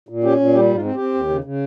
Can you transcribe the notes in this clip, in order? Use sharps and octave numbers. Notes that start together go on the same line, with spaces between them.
A#2
C#4 G4
A#2
G3 G4
G#2
F4
C4
C4 G4
D#2
C#3
C#3